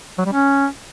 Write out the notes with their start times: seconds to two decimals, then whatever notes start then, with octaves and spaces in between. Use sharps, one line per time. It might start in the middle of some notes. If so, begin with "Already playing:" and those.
0.18 F#3
0.25 G3
0.33 C#4